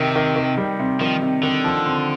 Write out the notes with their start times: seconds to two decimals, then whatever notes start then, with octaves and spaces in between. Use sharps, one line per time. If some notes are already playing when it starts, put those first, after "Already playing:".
Already playing: C3 D#3
0.16 D#3
0.36 D#3
0.57 G3
0.79 C3
1.00 D#3 F3
1.22 C3
1.43 D3 D#3
1.64 F3
1.86 C4